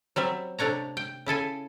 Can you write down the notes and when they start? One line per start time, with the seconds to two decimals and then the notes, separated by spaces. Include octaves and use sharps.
0.16 F#3 G3 C4 E5
0.59 C3 A3 D4 C#5 A#5
0.97 G5
1.26 C#3 E4 A4 G#5